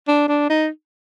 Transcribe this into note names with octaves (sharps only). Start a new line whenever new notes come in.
D4
D4
D#4